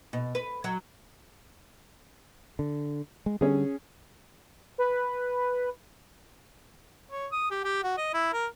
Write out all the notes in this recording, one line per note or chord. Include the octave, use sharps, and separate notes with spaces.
B2
B4
F#3
D3
G#3
D3 G3 C#4 G#4
B4
C#5
D#6
G4
G4
F#4
D#5
E4
A#4